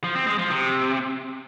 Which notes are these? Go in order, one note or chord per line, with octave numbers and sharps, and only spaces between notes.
F3
C4
G#3
F3
C3